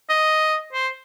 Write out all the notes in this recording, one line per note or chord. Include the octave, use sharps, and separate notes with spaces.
D#5
C5